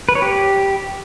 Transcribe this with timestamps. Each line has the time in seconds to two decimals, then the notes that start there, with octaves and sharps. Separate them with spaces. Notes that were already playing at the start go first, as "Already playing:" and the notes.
0.09 B4
0.15 C#5
0.22 G4